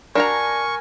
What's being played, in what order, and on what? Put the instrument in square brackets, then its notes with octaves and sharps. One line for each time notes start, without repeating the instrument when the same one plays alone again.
[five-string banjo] D4 F#4 A#5 [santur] A#4 [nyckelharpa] G#5 [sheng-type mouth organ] C#6